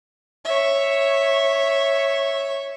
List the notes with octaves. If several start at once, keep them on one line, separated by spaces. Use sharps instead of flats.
C#5 E5